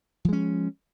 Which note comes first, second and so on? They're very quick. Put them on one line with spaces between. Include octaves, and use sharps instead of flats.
F3 G#3 C#4